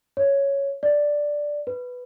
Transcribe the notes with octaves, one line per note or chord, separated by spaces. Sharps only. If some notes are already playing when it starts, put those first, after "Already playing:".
C#5
D5
B4